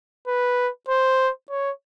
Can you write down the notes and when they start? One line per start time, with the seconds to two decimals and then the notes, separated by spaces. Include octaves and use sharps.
0.27 B4
0.88 C5
1.50 C#5